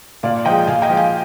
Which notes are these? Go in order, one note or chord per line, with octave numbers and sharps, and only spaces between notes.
A#2 D5 F5
F3 G#3 D#5 G5
A#2 F5 G#5
D#5 G5
F3 G#3
F5 G#5